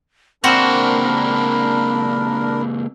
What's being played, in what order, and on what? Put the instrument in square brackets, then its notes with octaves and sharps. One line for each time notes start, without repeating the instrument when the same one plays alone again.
[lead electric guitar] C#2 A#3 [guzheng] C4 F#4 [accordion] D4 A#4 [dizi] B5